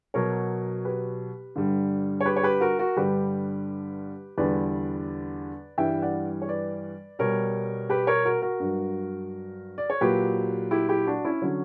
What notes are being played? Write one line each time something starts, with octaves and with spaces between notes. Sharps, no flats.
B2 F#3 A#4 C#5
G4 B4
G2 D3 G3
C#5
G4 B4
C#5
G4 B4
F#4 A#4
F#4 A#4
G2 D3 G3 G4 B4
E2 D3 G3 B4 D5
G2 E3 G3 E5 G5
D5 F#5
C#5
B4 D5
B2 G3 A#4 C#5
G4 B4
A#4 C#5
F#4 A#4
F#4 A#4
G2 F#3
D5
C#5
A#2 F#3 G4 B4
E4 G4
E4 G4
D4 F#4
C#4 E4
D3 F#3 C#4